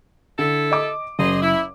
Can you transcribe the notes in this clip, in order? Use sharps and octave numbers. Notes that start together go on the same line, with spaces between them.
D3 E4 A4
D#5 D6
F#1 G#4 C5 D#5
E4